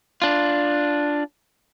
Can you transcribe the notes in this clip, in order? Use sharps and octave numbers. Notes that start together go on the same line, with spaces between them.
D4 F4